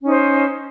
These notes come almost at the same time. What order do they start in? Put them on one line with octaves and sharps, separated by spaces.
C#4 D#4 C5